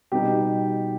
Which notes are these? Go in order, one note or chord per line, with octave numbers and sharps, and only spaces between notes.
B2 G3 B3 D#4 G4